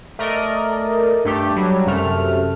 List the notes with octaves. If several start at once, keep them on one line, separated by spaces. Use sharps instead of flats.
A3 A#4 D5 D#5
G2 A3 G4
F#3 G3
F#2 C3 A3 F6